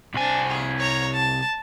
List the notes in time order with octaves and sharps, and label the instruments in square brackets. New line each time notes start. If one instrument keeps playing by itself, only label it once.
[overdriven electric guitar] C2 G#5 [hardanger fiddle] C4 D4
[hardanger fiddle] G#4
C#5 A#5
A5